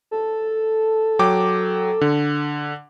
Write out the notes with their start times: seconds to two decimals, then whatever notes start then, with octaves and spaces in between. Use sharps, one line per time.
0.11 A4
1.19 F#3 G5 D6
2.01 D3